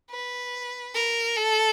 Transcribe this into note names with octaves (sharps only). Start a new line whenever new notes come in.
B4
A#4
A4